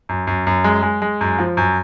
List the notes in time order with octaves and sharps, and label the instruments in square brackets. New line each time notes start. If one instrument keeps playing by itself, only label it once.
[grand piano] F#2
F#2
F#2
G#3
G#3
G#3
F#2
F3
F#2